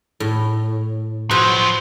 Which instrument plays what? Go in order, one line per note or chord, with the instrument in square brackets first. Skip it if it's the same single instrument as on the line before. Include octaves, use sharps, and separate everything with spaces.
[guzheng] A2
[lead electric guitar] F3 F#3 [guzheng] F#4 B4 C5